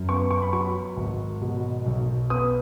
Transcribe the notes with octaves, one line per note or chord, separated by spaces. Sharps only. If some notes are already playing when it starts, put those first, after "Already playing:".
Already playing: F#2
B3 C#6
C#6
B5
F#3 C#6
G#1
B2
B1
B3 D#6